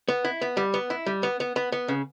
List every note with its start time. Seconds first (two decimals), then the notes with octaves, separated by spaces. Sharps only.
0.08 B3
0.25 E4
0.41 B3
0.57 G3
0.74 B3
0.90 E4
1.06 G3
1.23 B3
1.40 B3
1.56 B3
1.72 B3
1.88 C#3